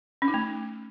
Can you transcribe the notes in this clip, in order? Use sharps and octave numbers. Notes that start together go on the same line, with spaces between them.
C#4
D#4
A3